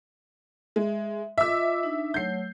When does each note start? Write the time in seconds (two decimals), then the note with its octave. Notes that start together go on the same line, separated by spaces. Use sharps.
0.76 G#3 E5
1.38 F4 D#5 E5 D6 E6
1.83 D4 D#4
2.14 F#3 A3 C#5 G6 C7